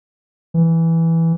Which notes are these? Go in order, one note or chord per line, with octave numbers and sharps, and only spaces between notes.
E3